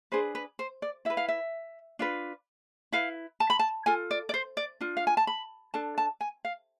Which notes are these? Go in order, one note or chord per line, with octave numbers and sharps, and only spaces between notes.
D4 G#4 B4 C5
B4
C5
D5
E4 B4 E5
F5
E5
D4 F4 B4
E4 B4 F5
A5
B5
A5
F4 A4 G#5
D5
D5
C5
D5
D4 F4
F5
G#5
A5
B5
D4 A4 A5
A5
G#5
F5